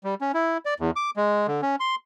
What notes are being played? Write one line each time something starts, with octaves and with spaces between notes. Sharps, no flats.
G3
C#4
E4
D5
E2
D6
G#3
D3
C#4
C6